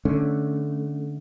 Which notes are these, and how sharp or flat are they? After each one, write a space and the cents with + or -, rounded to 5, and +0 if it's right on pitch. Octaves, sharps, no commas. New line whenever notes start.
D3 +5 A3 -10 C#4 +0